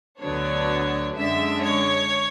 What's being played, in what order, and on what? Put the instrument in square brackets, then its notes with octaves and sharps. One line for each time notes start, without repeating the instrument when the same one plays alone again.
[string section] D2 D3 F#3 B3 D4 C#5
F#2 D3 G#3 E5
C#5